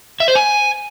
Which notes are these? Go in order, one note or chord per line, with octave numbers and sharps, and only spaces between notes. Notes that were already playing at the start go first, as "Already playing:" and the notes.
E5
C5
G#5